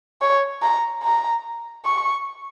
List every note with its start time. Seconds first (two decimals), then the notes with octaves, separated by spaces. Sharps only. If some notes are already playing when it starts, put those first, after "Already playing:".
0.22 C#5
0.62 A#5
1.03 A#5
1.85 C#6